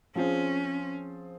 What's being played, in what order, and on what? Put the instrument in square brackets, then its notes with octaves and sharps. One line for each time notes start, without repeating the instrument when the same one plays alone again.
[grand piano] F3 C4 F4 G#4 C5 [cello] C#4